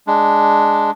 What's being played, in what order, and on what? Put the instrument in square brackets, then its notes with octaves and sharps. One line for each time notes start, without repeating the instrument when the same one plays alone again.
[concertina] G#3 D4